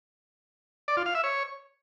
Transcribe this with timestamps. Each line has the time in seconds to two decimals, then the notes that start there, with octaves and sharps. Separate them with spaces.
0.88 D5
0.97 F4
1.06 F5
1.15 E5
1.24 C#5